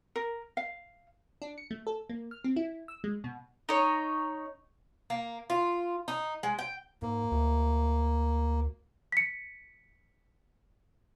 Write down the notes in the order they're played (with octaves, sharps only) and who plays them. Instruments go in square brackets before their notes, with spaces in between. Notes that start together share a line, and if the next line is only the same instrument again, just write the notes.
[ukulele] A#4
F5
[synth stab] D4
C#7
A3
A4
A#3
F6
C4
E4
E6
G#3
B2
[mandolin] D#4 C#5
[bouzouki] A#3
F4
D#4
G#3
G5
[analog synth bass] G#2 [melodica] A#3
[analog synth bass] D2
[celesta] B6 C#7